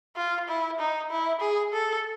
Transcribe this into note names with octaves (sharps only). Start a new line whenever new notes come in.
F4
E4
D#4
E4
G#4
A4